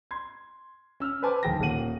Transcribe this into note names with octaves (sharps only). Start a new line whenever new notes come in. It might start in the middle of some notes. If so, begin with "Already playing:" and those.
C6 G#6
C#4 E6 F6
B4 C5 G#5 A5 D6
D1 D#2 G#4 G5 A5 A#6
D#1 A#3 G#4 F#5 D#7 F#7